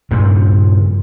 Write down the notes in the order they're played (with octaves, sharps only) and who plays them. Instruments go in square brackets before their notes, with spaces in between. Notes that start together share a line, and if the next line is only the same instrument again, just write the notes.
[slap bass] G2 A#2 C#3 F3